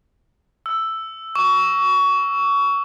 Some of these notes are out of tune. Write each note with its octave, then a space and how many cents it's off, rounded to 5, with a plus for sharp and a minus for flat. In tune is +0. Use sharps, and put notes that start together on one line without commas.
E6 +5
C#6 +25